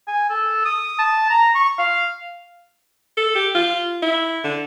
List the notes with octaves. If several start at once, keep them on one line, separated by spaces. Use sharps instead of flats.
G#5
A4
D#6
A5
A#5
C#6
F5
A4
G4
F4
E4
D3